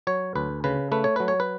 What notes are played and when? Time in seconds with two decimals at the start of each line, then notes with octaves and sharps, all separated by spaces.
0.07 F#3 C#5
0.35 D2 B4
0.64 C#3 B4
0.92 A3 B4
1.04 C#5
1.16 F#3 B4
1.28 C#5
1.40 B4